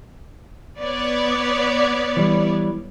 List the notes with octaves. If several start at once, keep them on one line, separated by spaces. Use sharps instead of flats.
B3 C#5 D5
E3 G3